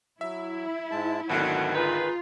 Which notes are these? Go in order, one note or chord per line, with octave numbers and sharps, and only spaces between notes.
F#3 E4 E5
G#2 G#3 A5
G#1 D2 B2 D3 D#3 F#3
D#4 F4 G#4 B4